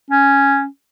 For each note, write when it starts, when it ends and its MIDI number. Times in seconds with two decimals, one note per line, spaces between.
0.11 0.65 61